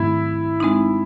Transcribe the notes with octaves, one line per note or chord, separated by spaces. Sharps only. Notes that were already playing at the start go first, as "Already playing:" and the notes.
Already playing: G#2 D#3 F#3 A3 C4 E4
G#3 C4 D#4